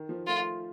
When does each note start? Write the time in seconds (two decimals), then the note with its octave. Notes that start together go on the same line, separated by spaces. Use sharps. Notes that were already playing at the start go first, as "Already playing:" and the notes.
Already playing: D#3
0.09 F3
0.27 A3 F4